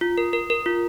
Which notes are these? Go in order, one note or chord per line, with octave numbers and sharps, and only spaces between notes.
F4
A#4
A#4
A#4
F4